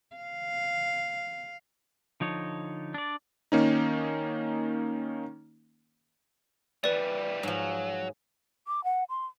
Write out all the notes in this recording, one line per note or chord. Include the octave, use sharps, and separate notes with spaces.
F5
D3 F3 D#4 C#5
D4 D5
D#3 A#3 C#4 D#4
E3 G3 B4 D5
G#2 F3 F#3
D6
F#5
C6